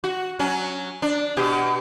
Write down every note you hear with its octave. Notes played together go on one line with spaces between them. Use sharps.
F#4
F#3 C#4
D4
B2 G4